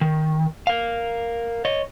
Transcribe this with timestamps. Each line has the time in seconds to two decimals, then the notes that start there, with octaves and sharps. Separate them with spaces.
0.01 D#3
0.67 A#4 F5
1.65 C#5 D#5